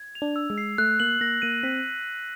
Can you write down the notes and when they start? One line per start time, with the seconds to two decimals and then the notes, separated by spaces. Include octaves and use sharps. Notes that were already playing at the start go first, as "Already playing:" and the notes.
Already playing: G#6
0.15 F7
0.22 D4
0.36 E6
0.50 G#3
0.58 C7
0.78 A3 F#6
1.00 A#3 F#7
1.21 A#3 A#6
1.42 A#3 D#7
1.63 C4 B6